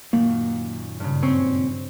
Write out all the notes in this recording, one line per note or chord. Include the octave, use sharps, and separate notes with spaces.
F#2 A#2 D#3 A#3
G2 C#3
C4 C#4 C5 C#6